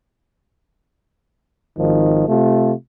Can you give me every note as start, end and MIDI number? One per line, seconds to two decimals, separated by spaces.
1.78 2.26 32
1.78 2.26 51
1.78 2.26 53
2.27 2.72 48
2.27 2.72 57
2.27 2.72 65